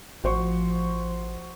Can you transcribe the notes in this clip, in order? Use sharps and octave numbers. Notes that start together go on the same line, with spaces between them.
A1 F3 F#4 C5 C#6